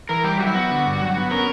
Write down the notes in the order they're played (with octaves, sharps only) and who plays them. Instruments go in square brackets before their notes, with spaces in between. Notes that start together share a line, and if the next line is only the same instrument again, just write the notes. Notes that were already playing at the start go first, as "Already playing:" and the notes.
[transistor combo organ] E3 [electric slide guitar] A#4
[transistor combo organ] G3 [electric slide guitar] G4
[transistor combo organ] F#3 [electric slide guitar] F#4
[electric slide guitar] E4
[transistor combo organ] B3 [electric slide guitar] F#4
[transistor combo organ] D3
G2
F#3
B3
[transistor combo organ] C#4 [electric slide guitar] A#4